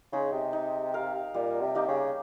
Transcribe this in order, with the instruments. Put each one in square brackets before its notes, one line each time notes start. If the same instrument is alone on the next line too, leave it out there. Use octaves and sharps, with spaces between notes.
[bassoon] C#3 [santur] G#3 D#4
[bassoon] C3
[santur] D#4
A#4 F5
[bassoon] A#2 [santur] G3
[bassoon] C3
[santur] A#3 D#4 G4
[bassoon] C#3